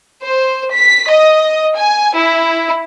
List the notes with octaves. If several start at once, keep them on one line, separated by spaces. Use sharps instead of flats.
C5
B6
D#5
G#5
E4